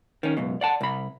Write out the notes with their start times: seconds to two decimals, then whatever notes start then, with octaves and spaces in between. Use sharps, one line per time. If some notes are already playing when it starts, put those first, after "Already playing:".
0.23 D#3 C#4
0.37 C#2 F#2 B2
0.61 D5 F#5 A5
0.81 C2 B5